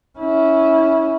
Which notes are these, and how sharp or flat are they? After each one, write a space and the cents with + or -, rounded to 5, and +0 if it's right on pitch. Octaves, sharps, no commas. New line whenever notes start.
C#4 +5 E4 -20